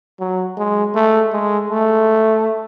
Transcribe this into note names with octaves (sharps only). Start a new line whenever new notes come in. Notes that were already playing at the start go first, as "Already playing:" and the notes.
F#3
G#3
A3
G#3
A3